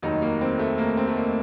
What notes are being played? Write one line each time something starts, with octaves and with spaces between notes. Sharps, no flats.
F1 D#2 D#3 F#3 D#4
A#3
C4
A3
A#3
C4
A3
A#3